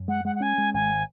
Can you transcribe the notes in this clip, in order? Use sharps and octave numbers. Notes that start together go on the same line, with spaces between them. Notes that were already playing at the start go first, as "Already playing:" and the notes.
Already playing: F#2
G#3 F#5
G#3 F#5
F#5
C#4 G#5
G#3
G#1 G#5